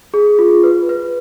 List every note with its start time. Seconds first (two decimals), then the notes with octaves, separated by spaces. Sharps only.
0.14 G#4
0.39 F4
0.63 B4
0.89 B4